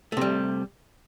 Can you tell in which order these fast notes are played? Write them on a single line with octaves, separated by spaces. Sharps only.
A3 C3 G3